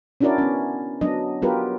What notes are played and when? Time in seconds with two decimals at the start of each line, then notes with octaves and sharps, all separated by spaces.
0.21 C#4 D4 E4 F#4 A#4 D5
0.38 B3 C#4
1.01 F#3 B3 D4 D#5
1.42 F#3 B3 F4 G4 A#4 B4